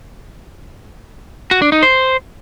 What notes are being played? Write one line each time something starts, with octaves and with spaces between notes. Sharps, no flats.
F#4
D4
D#4
C5